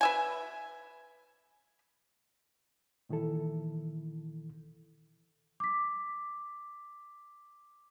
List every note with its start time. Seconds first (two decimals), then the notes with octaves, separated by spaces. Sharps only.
0.01 B4 E5 G#5
3.09 A#2 D#3 E3 E4 A4
5.60 D6 B6